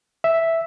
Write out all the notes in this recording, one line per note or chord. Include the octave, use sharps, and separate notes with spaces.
E5